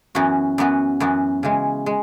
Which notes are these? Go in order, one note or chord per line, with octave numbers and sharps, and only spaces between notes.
F#2 E3 B3 F#4
F#2 E3 B3 F#4
F#2 E3 B3 F#4
C#3 E3 G#3
G#3